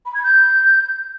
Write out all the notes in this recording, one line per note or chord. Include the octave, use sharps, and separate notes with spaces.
B5
G#6
G6